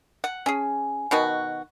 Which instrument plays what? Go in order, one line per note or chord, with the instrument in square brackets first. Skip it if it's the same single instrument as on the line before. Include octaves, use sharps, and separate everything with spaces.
[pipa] F#5
[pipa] C#4 G#4 [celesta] G#5
[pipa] B2 D#3 F#4